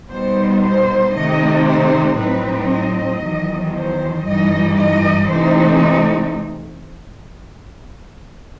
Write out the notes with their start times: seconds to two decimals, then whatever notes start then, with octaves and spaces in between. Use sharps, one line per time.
0.10 B2 G3 B3 D#4 C5
0.63 C5
1.15 C3 D#3 A3 D#4 D#5
1.66 C5
2.18 A2 F#3 C4 D#4 B4
2.71 D#5
3.22 E2 D#3 F#3
3.74 C5
4.26 G2 E3 G3 D#4 D#5
4.77 D#5
5.30 C3 E3 A3 C4 D#4 C5